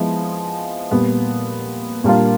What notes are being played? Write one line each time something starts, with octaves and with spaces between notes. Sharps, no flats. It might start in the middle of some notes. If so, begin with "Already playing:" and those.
Already playing: F3 G#3 B3 E4
A#2 G3 B3
A#2 G3 A#3 D4 F4